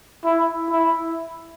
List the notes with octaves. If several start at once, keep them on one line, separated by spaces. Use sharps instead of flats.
E4
E4